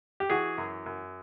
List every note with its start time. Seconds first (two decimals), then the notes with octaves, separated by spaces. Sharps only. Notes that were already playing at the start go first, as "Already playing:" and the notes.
0.20 G4
0.30 E3 F#4 G#4
0.58 F#2
0.86 F#2